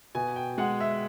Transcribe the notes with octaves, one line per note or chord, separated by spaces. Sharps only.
B2 G#5
G5
G#3 F#5
E5